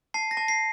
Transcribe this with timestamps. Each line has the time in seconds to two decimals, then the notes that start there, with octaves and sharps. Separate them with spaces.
0.14 A5 C7
0.31 A#6
0.37 A5
0.48 C7